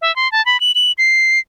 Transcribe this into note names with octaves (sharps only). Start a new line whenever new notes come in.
E5
C6
A5
B5
F#7
F#7
C7